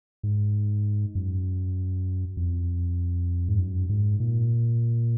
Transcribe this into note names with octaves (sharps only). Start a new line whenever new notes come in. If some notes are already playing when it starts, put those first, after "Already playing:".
G#2
F#2
F2
G#2
F#2
G#2
A#2